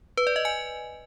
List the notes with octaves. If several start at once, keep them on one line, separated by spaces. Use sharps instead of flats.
B4
D5
D#5
G#5